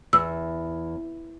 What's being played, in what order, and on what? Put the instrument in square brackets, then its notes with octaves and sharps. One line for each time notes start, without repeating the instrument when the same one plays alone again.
[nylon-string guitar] E2 [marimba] E6